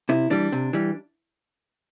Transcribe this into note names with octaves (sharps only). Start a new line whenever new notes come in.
C3 E4
E3 G3 D4
C3
E3 G3